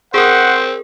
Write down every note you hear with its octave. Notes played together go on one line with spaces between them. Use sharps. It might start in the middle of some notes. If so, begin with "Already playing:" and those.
C4 G#4 A#4 C5 F#5